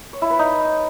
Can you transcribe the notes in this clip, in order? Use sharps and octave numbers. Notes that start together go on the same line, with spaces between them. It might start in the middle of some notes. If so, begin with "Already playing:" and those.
C#5
E4
B4
D#4